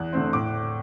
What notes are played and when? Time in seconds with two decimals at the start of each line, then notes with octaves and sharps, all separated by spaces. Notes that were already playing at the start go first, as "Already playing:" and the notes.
Already playing: E2 F#6
0.13 D3 A3 C4 C6
0.33 A2 D6